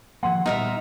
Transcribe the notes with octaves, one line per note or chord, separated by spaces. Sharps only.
D#3 F3 A#3 F#5 C6
A#2 G3 B3 D#4 A#4 E5